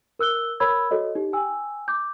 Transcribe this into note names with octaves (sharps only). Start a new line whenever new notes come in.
A#4 E6 F#6 G7
A#4 C#5 B5 E6 G#6
F#4 A4 C#5 D#5
D#4 G4
G5 G#5 E6
D6 G6